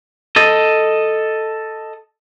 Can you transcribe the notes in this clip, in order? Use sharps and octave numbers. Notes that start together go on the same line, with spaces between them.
A4 D#5